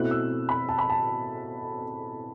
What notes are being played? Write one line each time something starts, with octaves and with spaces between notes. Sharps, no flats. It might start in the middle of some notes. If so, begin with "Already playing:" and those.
Already playing: B2 A3 C4 E4 F#6
E6
B5
A5
B5
A5